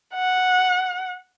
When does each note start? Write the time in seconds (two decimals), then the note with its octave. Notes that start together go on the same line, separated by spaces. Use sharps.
0.14 F#5